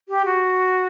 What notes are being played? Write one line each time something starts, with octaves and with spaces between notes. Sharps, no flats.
G4
F#4